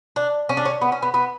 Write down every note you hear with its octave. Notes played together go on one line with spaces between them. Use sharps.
D4
C#4
D4
C#4
B3
C#4
B3
B3